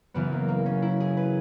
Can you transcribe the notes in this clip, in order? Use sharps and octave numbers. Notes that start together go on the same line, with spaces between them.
F#2 C#3 E3 B3
A#3
A#3
C#4
E4
G#4
B4